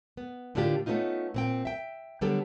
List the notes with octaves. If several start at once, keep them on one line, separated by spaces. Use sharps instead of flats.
B3
A2 D3 A#3 D4 F4 G4
A3 B3 C#4 D#4 F4
A#2 C4 G5
E5 G5
D3 F#3 G3 B3 G4 A4